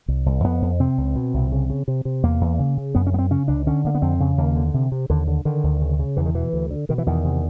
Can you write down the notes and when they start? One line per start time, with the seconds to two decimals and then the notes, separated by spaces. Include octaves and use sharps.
0.08 C2
0.26 C2
0.44 F2 B3
0.62 F2
0.79 C3 C4
0.98 C#2
1.16 B2
1.34 C2
1.52 C#3
1.70 C#3
1.88 C3
2.05 C3
2.23 E2 A#3
2.41 E2
2.59 C#3
2.77 C#3
2.95 F#2 B3
3.07 C#4
3.13 F#2 B3
3.19 C4
3.30 C#3 C#4
3.48 C#2 D4
3.66 D3 C#4
3.84 D3 A#3
3.95 B3
4.02 F2 C4
4.20 C#3
4.38 D#2 A#3
4.56 D3
4.74 C3
4.92 C3
5.10 D#2 D3
5.28 D3
5.45 D3 D#3
5.64 D2
5.81 C#3
5.99 C#3
6.17 E2 E3
6.26 D#3
6.35 B2 E3
6.53 D2
6.71 D3
6.89 B2 D#3
6.98 E3
7.06 E2 D#3
7.25 C3